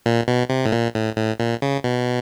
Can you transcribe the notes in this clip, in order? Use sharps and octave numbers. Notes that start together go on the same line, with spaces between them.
A#2
B2
C3
A2
A#2
A2
A2
A#2
C#3
B2